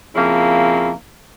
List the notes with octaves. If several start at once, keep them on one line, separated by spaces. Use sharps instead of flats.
F2 C#3 A#3 E4